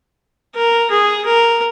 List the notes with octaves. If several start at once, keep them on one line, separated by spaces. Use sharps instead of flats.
A#4
G#4
A#4